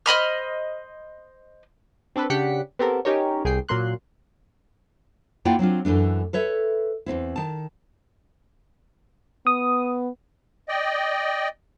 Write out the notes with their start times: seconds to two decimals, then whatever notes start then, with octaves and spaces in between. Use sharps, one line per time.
0.06 C5 D#5 B5 F6
2.16 C4 D4 A4 B4
2.30 C#3 D4 G4 F#5 B6 C#7
2.79 B3 C4 G4 A4 A#4
3.05 C#4 D#4 G4 A#4 C#5
3.45 C2 G#4 G5 C7
3.69 A#2 F#3 A#3 C6 F#6
5.45 A#3 E4 F4 D5 F#5 G5
5.59 F#3 C4 D4 F4
5.85 F#2 E3 A3 D4
6.33 A4 B4 C#5 E5
7.06 E2 G2 C4 E4
7.36 D#3 A5
9.47 B3 D#6
10.69 D5 D#5 G5